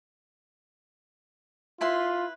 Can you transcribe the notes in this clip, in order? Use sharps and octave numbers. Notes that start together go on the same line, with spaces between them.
E4 F4 B4 C6